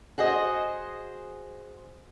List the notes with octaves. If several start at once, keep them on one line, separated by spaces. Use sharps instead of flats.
F#4 G#4 C5 D#5